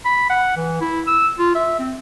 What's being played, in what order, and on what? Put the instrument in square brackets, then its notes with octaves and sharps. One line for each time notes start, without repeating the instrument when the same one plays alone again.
[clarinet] B5
F#5
E3
E4
E6
F4
E5
C4